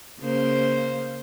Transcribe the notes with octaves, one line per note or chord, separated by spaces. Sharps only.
C#3 A#3 C5